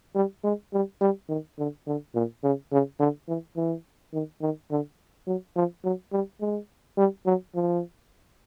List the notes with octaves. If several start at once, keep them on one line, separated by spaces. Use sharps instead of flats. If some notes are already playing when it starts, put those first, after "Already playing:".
G3
G#3
G3
G3
D#3
D3
D3
A#2
C#3
C#3
D3
E3
E3
D#3
D#3
D3
F#3
F3
F#3
G3
G#3
G3
F#3
F3